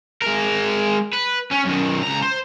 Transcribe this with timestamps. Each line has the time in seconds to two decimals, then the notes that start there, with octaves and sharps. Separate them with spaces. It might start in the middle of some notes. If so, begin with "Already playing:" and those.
0.22 G#3 A#4
1.13 B4
1.52 C#4
1.65 F#2 D#3
2.03 C#2 A#5
2.22 C5